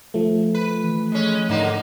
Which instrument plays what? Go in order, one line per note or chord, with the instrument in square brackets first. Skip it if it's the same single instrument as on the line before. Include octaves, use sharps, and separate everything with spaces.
[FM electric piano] F3 A3
[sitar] B4
[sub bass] E3
[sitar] G#3 C#4
[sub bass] G#2 [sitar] D3 A#3 D#4